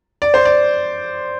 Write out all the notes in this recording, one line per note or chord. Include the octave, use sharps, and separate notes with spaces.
D5
C5
D5